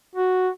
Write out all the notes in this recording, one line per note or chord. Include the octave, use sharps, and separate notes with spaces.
F#4